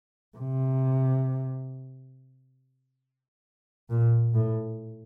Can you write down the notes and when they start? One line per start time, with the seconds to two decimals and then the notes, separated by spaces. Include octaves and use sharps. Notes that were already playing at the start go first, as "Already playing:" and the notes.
0.38 C3
3.90 A#2
4.34 A2